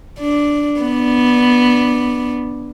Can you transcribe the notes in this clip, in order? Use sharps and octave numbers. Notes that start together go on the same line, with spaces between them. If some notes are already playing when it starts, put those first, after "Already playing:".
D4
B3 D4